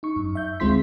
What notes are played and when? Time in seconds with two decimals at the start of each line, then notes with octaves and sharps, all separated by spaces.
0.03 D#4 C#6
0.16 F#2
0.35 E5 G6
0.60 D2 G#3 C4 F4 C6 B6